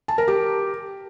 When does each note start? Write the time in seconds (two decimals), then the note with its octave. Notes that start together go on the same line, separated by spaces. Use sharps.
0.08 A5
0.18 A#4
0.28 G4